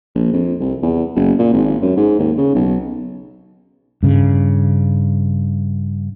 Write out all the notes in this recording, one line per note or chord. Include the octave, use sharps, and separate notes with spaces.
A#1
F2
C2
E2
F#1
A#2
G#1
F#2
G#2
D#2
C#3
B1
G2 C#3